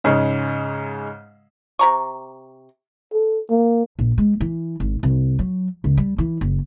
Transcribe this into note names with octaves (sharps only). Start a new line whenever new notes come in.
G#2 C#3 G#3
C3 A#5 C#6
A4
A#3
A#1
G#3
E3
G#1
C2
F#3
C#2
G3
E3
F#1